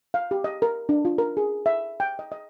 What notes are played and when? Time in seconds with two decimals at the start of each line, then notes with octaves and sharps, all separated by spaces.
0.14 F5
0.31 G4
0.44 D#5
0.62 A#4
0.89 D4
1.05 F4
1.18 A#4
1.37 G#4
1.66 E5
2.00 G5
2.19 D#5
2.32 D#5